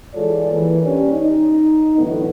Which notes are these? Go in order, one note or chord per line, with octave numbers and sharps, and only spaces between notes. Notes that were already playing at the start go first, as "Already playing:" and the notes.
E3 G#3 F4 A4 C#5 D5
E3 A#3
G3 C#4 D4
D#4
A2 D3 E3 F#3 A3 B3